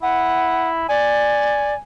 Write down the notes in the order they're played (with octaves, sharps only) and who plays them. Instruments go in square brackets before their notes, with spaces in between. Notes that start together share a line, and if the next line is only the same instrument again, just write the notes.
[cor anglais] E4 [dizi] F#5
[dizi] D5 [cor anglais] G#5